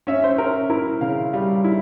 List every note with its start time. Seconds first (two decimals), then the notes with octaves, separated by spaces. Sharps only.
0.07 C#4 E5
0.24 C5
0.38 C#4 A#4
0.70 E4 A#4
1.01 C#3 F5
1.33 G3 F5
1.64 E4